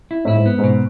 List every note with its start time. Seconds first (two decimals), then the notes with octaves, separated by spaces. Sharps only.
0.11 E4
0.25 A2 E4
0.35 G#2
0.46 B3
0.58 G#2
0.64 B2